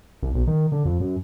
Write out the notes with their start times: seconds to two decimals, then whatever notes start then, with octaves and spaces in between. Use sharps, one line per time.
0.22 C2
0.34 B1
0.47 D#3
0.72 D3
0.85 F2
1.00 F#2